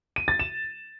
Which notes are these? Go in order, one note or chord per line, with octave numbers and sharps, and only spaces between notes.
D#7
A6
E7